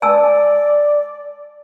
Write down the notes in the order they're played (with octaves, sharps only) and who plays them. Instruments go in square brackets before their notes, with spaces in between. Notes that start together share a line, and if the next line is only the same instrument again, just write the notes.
[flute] D5 [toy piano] G#5 A5 E6